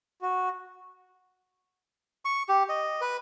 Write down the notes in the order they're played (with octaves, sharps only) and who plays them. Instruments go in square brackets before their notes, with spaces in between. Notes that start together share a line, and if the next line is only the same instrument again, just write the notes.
[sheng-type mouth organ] F#4
[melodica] C#6
G4
D#5
B4